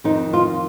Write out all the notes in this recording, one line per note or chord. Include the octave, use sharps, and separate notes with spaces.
F2 D#3 D#4
F4